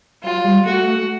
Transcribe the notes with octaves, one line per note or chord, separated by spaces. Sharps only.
F#3 F4
G3
A3 F#4